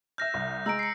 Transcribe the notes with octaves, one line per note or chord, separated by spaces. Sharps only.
E5 F6 G6 A#6
C2
G#3 A#5 E6 D7
C7 C#7